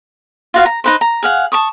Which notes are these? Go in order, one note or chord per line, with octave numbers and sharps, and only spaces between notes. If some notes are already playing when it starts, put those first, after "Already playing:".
F4 F#4 F5
A#5
D#4 B4 C5
A#5
G#4 F5 F#5
A5 C#6 D#6